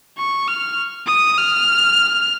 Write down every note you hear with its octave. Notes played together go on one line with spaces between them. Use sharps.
C#6
F6
D#6
F6